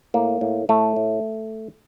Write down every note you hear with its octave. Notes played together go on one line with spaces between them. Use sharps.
A2 A#3
A2
A2 A3
A2